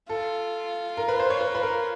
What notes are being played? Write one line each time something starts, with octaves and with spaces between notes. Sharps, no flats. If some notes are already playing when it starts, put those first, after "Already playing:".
F4 A4
A#4
B4
C5
C#5
B4
B4
A#4